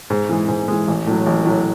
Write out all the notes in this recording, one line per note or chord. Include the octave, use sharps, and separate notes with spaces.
G#2
E3 G#3
G#2
E3 G#3
A1
A2 F#3
A1
A2 F#3